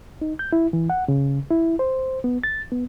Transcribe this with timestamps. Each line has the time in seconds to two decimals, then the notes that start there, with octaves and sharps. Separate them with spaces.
0.21 D#4
0.39 G6
0.53 E4
0.73 E3
0.90 F#5
1.08 C#3
1.50 E4
1.79 C5
2.24 B3
2.44 A6
2.72 B3